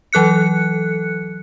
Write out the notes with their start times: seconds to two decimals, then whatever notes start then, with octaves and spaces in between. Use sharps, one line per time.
0.13 E3 F#3 A4 F#6 C#7